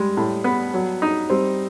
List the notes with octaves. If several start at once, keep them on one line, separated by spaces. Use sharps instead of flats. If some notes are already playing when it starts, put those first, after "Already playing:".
Already playing: G3 G#3
A2
B3
F#3
D#4
G3 C4